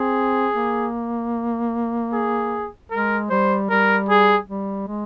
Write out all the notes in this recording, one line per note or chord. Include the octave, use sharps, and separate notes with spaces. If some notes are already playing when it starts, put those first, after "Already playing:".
Already playing: C4 G#4
A#3
G#4
G#3 A#4
G3 C5
G3 A#4
G#4
G3
G#3